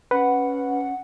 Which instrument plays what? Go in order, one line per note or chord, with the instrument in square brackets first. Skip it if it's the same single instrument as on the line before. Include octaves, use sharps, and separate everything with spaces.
[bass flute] C#4 [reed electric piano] B4 [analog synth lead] F#5